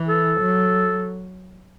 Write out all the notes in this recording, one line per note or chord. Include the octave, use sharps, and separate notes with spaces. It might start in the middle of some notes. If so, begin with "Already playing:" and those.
Already playing: E3
A4
F#3